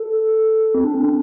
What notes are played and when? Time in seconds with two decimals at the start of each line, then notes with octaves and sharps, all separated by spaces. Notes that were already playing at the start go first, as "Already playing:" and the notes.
Already playing: A4
0.74 C4
0.84 D4
0.95 C4
1.05 D4